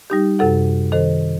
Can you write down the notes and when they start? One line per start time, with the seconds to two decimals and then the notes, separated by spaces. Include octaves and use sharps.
0.10 G3 D#4 G4
0.39 F#2 C3 A4 F#5
0.92 D#3 A4 C5